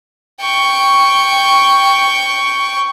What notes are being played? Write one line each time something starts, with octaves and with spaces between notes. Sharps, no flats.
G5 C#6